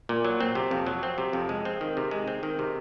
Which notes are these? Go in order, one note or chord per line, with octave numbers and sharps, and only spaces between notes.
A#2
F#3
C4
C3
F2
F#3
C4
C3
F2
G#3
C4
D#3
C3
G#3
C4
D#3
C3